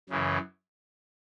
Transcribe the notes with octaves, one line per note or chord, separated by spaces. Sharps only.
F#2 C#3 E3